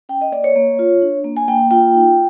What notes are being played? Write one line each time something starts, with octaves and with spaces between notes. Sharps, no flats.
C#4 G5
D#5
A#3 D5
C#5
A#3
F4
D4
A#3
G#5
A#3 G5
F4 G5
D#4